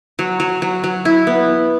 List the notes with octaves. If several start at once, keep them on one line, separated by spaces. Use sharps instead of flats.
F#3
F#3
F#3
F#3
E4
B3